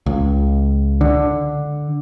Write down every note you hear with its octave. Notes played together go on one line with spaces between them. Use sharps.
C#2
D3